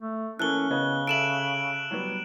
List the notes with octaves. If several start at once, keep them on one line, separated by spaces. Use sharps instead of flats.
A3
E3 A#3 C#4 A4 F#6 G7
C#3 B3 C#4 D#5
A4 E5 D7 E7 F#7
F#3 G3 B3